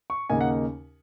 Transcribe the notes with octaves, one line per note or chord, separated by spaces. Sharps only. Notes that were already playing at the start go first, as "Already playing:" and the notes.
C#6
D#2 C#3 A#3 D#4 G#5
F#5